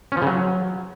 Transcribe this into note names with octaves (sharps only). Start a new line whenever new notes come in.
C#4
F3
C#3
F#3